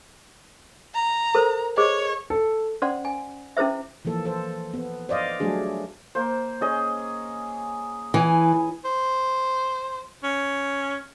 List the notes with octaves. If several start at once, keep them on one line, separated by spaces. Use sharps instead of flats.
A#5
A4 A#4 C5
G#4 C5 C#5 D#5
A4
C#4 C5 D5 F#5 C6
G#5
C#4 E4 G#4 C5 E5
E3 F3 A#3 A4
A4 C5
B3
C5 D5 D#5 F5
F#3 G3 A3 D4 G#4
A#3 C5
C#4 G#4 D#5
E3 G#5
C5
C#4